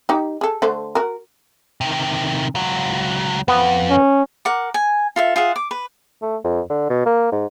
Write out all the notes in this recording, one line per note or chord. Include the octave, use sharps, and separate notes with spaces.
D#4 G4
G#4 A4
D3 A3 C5
F#4 A#4
C3 D#3
C#2 F#3
F2 B3
C#4
A#4 F#5 D6
G#5
F4 A4 E5
F4 G#4 E5 F#5
D6
B4
A3
F2
D3
B2
A#3
G#2